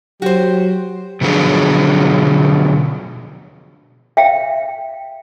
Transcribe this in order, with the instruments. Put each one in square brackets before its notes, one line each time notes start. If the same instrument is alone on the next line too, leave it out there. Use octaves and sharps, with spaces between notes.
[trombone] F#3 [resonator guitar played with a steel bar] F#4 C5 [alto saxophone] G4
[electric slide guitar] B2 D3 F3 F#3 G#4
[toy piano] E5 F5 G5